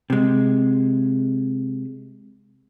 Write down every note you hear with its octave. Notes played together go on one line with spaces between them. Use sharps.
C3 G#3